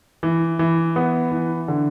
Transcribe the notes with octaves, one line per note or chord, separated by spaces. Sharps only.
E3
E3
B3
E3
D3